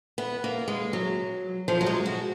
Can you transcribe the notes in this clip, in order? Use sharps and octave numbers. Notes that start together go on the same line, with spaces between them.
B3
A#3
G#3
F#3
F3
F#3
G#3
F#4